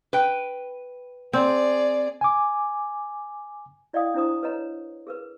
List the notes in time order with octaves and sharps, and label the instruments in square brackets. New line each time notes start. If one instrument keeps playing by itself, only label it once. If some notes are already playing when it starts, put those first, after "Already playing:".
[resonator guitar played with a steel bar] B4 G5
[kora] C4 [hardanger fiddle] G#4 D5
[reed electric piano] G#5 D6
[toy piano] E4 D5 D#5 F5 G5 D#6
D4 E4 C5 A#5 D#6
B4 C#5 D#5 A#5
G#4 A#4 B4